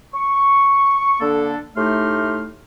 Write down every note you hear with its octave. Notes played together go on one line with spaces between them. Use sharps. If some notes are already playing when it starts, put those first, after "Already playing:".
C#6
D3 A#3 D4 A4
A2 A3 D#4 G4 C6 F6